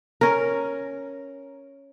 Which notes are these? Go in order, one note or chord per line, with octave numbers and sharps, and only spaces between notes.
C#4 A#4